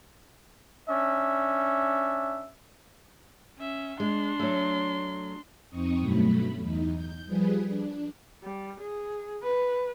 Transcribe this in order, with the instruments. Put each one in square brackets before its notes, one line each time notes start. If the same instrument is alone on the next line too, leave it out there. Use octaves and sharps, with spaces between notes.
[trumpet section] C#4 D4 E5
[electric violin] C#4 E5
[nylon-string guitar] G#3 [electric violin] D4 C6
[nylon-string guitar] F#3 A3
[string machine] F2 C4 D#4 C#6 D#6
G2 B2 F#3 A3 B5
E2 D#4
G6
F3 G3 G#4 B4
D4
[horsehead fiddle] G3
G#4
B4